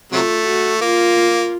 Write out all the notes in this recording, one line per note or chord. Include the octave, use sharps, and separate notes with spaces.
C3 F#3 A3 F4
F#4
A#3 F4